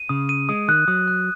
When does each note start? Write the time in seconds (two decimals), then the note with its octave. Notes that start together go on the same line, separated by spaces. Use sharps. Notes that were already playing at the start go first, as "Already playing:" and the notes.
Already playing: D#7
0.09 C#3 D#6
0.29 D#7
0.49 G#3 D#6
0.68 D#3 F#6
0.88 F#3 D#6
1.08 F#6